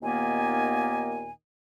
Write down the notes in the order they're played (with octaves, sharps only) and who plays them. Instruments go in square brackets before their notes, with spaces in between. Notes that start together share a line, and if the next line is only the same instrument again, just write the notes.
[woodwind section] D#2 A#2 D#3 A#3 B3 G#5